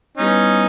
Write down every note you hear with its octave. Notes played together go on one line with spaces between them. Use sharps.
G3 B3 C#4 D#4 E4 G4 B4